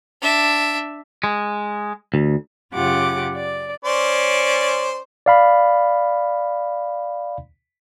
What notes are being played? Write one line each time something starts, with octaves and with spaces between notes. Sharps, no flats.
D4 E5
G#3
D2
F#2 C#3 F4 G4 F#5 D6
D5
C#4 C5 D5
D5 F5 B5